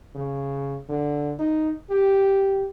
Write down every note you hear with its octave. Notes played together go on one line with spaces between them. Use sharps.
C#3
D3
D#4
G4